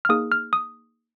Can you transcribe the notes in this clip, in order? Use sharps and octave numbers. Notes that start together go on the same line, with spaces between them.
F6
A#3 D#4 G#4 D#6
F6
D#6